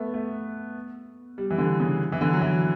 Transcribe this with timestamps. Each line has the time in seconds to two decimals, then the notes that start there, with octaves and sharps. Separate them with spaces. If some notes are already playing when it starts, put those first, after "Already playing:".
Already playing: A3 B3
0.14 A3
1.38 G3
1.51 E3
1.58 D3
1.80 C#3
2.12 E3
2.21 D3
2.33 F#3
2.41 E3